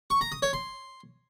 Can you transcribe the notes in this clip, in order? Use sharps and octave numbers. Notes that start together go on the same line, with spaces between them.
C#6
A#5
D#6
C#5
C6